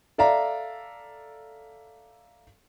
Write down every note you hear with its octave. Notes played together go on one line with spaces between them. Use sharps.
A4 D5 E5 F5 A#5